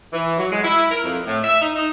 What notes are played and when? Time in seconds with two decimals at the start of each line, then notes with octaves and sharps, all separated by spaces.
0.13 E3
0.38 F#3
0.52 G#3
0.64 E4
0.91 A#4
1.04 F2
1.26 A2
1.44 E5
1.61 D#4
1.76 D#4